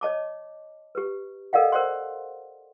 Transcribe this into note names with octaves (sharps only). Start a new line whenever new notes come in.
C#5 D#5 A5 D6
G4 B4
A4 A#4 D5 D#5 F5 F#5
A#4 C5 D5 F#5 C6